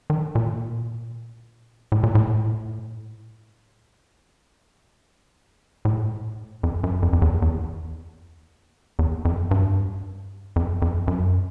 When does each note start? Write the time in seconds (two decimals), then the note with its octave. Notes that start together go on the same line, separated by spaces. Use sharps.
0.10 D#3
0.35 A#2
1.92 A2
2.03 A#2
2.15 A2
5.85 A2
6.63 F2
6.84 F#2
7.03 F2
7.13 F2
7.22 E2
7.42 E2
8.99 E2
9.25 F2
9.51 G2
10.56 F2
10.82 F2
11.08 F#2